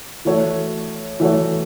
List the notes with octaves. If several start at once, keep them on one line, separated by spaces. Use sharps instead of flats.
E3 A3 F#4 C#5
E3 A3 F#4 C#5